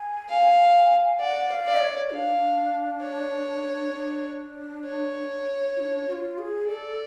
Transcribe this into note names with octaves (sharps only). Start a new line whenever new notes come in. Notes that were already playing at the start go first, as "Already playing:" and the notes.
Already playing: G#5
F5
D5 F#5
F5
D5
C#5
D4 F5
C#5
D4
C#5
F4
D4
F#4
F4
G#4
A4 D5